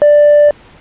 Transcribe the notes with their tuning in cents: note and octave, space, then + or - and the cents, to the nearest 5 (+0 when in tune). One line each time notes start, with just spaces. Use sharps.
D5 +5